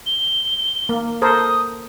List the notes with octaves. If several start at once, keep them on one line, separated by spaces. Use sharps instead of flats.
G7
A#3
A4 A#4 C5 D#6